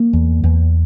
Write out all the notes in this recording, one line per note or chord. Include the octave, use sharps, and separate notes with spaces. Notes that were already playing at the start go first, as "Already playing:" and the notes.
Already playing: A#3
E2
E2